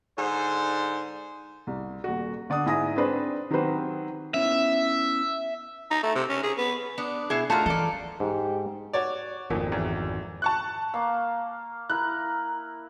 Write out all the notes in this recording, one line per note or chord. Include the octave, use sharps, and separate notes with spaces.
G#2 D3 C5
C2
D#1 F#4
D3 D5 F#5 D#6
G#2 E4 G#5 D#6 A#6
C4 D4 G#4 B4 C5 D5
D#3 F#3 C4 G4 B4 C5
B3 C#4 E4 E5
D#4
A3
C3
C#4
G#4
B3
B3 D4
B2 E4 G#4
A3 D#4 F4 F#4 A#4 A5
E3 A4 D5
G#2 G4
F#4 C#5 D5
G#1 F2 A#2
E2
A5 C#6 F#6
A#3 F5
E4 A#4 F#6